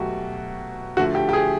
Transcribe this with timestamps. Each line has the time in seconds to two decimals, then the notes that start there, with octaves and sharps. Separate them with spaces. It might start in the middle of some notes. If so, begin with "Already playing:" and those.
Already playing: B2 F#3 A3 F#4 G4
0.97 D3 F3 A3 F#4
1.15 G4
1.29 G4
1.33 G#4